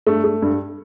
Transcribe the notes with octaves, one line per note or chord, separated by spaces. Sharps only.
G2 A3
A3
G2